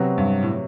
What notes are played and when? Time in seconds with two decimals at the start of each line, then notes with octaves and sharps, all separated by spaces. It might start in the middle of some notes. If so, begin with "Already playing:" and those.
Already playing: C3 F#3 B3 F#4
0.18 G2
0.43 A2